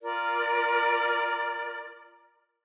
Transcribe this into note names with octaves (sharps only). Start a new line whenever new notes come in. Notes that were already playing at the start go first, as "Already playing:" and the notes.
F4 A#4 D5